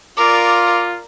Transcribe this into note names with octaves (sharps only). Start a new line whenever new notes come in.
F4 A#4 D5 D6